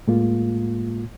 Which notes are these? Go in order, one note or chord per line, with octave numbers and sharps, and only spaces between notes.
A2 G#3 A#3 F4